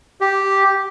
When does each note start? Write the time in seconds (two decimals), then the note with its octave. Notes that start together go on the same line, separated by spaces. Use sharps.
0.21 G4